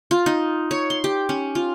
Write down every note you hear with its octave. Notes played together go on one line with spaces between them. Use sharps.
F4
D#4
C#5
C6
G4
C#4
F4